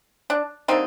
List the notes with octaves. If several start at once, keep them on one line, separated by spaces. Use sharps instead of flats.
D4
D3 G3 A#3 C4 D#4